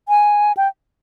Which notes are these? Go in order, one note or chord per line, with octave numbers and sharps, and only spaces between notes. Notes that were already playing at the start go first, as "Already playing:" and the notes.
G#5
G5